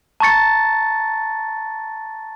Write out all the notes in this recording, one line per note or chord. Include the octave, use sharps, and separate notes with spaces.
A5 A#5 C#6 A6 C#7